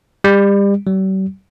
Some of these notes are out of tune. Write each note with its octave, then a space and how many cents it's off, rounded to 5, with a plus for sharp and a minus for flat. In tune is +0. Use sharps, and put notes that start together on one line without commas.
G3 +30
G3 -45